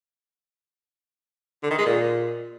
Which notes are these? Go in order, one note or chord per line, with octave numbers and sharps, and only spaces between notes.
D3
D#3
G#3
A#2